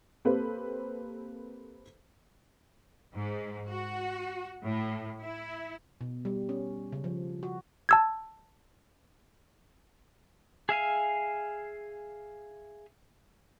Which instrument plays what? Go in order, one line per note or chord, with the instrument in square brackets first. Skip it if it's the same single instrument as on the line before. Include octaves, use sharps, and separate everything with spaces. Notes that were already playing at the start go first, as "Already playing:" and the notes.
[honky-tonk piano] A#3 C4 G4 A4 B4 C5
[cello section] G#2
F#4
A2
E4
[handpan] B2
G3
C#4
C#3
F3
F#4
[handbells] A5 E6 G#6
[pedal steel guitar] G#4 E5 F5 G#5